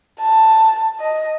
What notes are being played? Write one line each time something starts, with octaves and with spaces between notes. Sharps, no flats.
A5
D#5